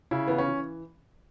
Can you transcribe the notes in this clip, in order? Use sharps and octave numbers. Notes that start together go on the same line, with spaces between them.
C#3 E4
E3 B3
C#4
E3